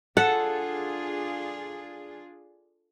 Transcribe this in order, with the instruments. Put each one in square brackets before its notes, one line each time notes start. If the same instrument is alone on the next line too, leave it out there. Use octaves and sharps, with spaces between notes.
[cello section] D4 F4 G#4 [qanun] A4 [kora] F#5